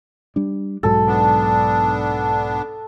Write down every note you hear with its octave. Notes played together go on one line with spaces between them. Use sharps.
G3 D4
B1 G#2 F#3 A4
B3 D4